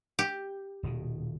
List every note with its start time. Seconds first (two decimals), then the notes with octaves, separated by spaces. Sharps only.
0.19 G4
0.83 D#1 B2 D#3